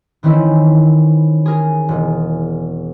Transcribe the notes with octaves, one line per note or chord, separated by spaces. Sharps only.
D#3 E3 C4 C#4 E4
G#4 A#4
E1